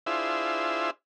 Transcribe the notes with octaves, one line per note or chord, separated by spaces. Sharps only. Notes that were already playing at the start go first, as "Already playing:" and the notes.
D4 E4 F4 G#4 C5 E5